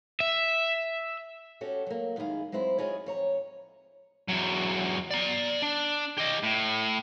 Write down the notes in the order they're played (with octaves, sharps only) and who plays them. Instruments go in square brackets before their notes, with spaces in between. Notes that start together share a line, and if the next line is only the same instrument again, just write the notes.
[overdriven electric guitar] E5
[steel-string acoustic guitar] C#4 F#4 G4 A4
F#3 A#3
F#2 D#3 G#3 E4 G#4 F5
F#3 G#3 C4 E4 C5
F4 F#4 G#4 C#5 D#5
F2 C#5 A#5
[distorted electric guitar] E2 F#3
D5 A#5
D4
G4 D#5
A2